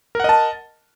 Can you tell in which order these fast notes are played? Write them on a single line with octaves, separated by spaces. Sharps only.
A#4 F#5 D#5 A5